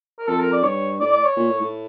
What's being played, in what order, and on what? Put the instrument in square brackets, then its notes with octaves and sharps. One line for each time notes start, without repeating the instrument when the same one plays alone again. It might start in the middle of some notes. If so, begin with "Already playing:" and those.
[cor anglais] A#4
[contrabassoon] F2 [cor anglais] A4
[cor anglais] A#4
D5
[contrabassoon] G2 [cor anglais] C#5
[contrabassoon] A2 [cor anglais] D5
[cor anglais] D5
C#5
[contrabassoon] A#2
A2
A2